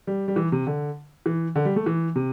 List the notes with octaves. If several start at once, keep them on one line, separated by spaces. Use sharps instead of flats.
G3
G3
E3
C3
D3
E3
D3
G3
A3
E3
C3